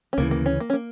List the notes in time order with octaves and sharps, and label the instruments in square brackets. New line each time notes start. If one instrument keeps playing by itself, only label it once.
[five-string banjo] C#4
[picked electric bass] D2 C#3 E3 [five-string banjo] A#3
[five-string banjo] A#3
C#4
A#3
C#4
A#3